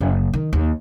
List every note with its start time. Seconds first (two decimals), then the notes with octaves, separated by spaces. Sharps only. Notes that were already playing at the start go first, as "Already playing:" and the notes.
0.01 F#1
0.34 D#3
0.53 D#2